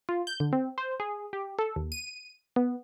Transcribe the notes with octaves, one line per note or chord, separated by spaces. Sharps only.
F4
G6
D3
C4
C5
G#4
G4
A4
D#2
D#7
B3